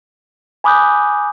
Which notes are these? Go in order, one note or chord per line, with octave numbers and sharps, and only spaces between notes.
G#5 B5 D6 D#6 F#6 G6